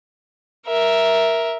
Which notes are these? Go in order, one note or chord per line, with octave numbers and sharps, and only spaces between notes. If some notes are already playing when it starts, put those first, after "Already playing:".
A#4 E5